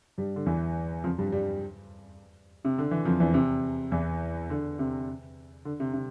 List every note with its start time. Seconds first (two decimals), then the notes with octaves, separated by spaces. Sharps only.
0.18 G2 G3
0.36 D3
0.46 E2 E3
1.04 F2 F3
1.18 G2 G3
1.32 G2 G3
2.65 C3
2.78 D3
2.91 E3
3.05 F2 F3
3.20 E2 E3
3.34 C3
3.92 E2 E3
4.50 D3
4.79 C3
5.65 D3
5.80 C3
5.94 C3